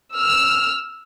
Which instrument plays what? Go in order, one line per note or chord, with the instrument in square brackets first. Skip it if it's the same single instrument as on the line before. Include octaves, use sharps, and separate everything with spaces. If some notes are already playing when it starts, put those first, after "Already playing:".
[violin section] E6 F6